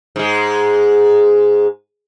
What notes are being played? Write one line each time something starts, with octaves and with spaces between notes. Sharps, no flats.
G#2 G#3